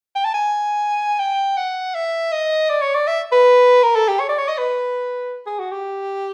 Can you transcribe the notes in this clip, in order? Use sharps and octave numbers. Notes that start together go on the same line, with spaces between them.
G5
A5
G#5
G5
F#5
E5
D#5
D5
C#5
D5
E5
B4
A#4
A4
G4
C#5
D5
C#5
D#5
B4
G#4
F#4
G4